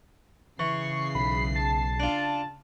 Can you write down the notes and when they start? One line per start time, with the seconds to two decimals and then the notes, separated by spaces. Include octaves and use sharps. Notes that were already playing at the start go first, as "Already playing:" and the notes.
0.59 C#3 E3 C#6 C7
1.15 B1 B5
1.55 A5
2.00 D4 F4